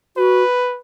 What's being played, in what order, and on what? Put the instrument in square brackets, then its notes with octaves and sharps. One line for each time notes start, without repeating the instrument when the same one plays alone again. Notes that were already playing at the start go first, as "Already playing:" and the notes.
[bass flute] F#4 [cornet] B4